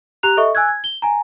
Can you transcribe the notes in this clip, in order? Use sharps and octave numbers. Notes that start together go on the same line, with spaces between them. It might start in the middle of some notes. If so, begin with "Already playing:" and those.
G4 A#5 F#6 F7
A4 D#5 E5 C#6
G#5 E6 F#6 G#6
G#6
G7
G#5 A#5